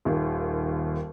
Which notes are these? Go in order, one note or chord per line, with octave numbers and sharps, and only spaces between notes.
D#1 D#2